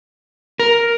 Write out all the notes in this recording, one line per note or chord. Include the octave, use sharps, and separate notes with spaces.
A#4